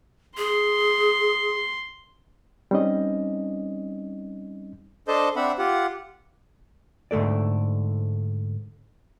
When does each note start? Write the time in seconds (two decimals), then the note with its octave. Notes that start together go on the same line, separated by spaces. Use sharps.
0.37 G#4 C6
2.71 G3 C4 C#4 D#4 D#5
5.08 D4 A4 C5 D#5 A5 G6
5.36 C4 D4 E5 F#5 B5
5.58 F4 G4 F#5
7.11 G#2 D3 A3 A4 D5